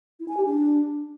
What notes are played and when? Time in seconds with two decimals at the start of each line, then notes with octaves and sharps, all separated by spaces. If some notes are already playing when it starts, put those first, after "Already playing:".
0.20 E4
0.28 G#5
0.37 G4
0.46 D4